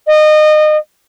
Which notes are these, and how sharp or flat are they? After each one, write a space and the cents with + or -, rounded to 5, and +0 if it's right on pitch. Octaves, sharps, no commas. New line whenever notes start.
D#5 -25